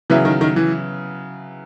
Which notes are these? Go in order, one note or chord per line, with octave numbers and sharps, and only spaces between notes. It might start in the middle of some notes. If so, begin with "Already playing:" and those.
C#3 E3 F#3 B3 E4
D#3
D#3
E3